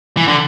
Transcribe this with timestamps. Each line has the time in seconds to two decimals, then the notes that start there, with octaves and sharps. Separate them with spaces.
0.17 E3
0.28 D3